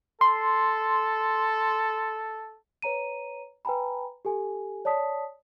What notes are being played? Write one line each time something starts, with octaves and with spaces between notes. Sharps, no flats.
A4 C6
B4 C#5 A#5 D#7
B4 G5 G#5 A#5 B5
G4 A4 G#5
C#5 D5 A5 D#6 B6